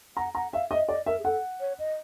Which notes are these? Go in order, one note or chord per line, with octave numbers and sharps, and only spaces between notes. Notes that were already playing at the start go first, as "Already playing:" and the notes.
F#5 A#5
F#5 A#5
E5 F5
D#5 E5
D5 D#5
A#4 E5
G#4
A4 F#5
C#5
D#5